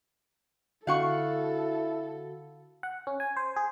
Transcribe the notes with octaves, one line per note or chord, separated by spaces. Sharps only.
D3 E4 F#4 A4 F5 F#5 C#6
F#5
C#4
G#5
C5
G#4